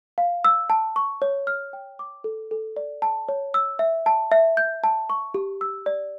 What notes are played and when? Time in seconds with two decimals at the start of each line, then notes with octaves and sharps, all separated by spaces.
0.18 F5
0.45 E6
0.70 A5
0.96 C#6
1.22 C#5
1.47 F6
1.73 G5
1.99 D6
2.24 A4
2.51 A4
2.77 D5
3.02 A5
3.29 C#5
3.54 E6
3.79 E5
4.06 A5
4.32 E5
4.57 G6
4.84 A5
5.10 C#6
5.34 G4
5.61 E6
5.86 D5